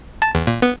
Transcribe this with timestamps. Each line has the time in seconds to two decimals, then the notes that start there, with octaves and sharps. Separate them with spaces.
0.22 A5
0.35 E2
0.47 A#2
0.62 B3